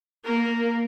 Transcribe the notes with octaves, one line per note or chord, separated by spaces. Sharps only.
A#3 A#4